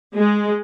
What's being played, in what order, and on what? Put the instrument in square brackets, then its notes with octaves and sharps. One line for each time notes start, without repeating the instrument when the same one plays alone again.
[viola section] G#3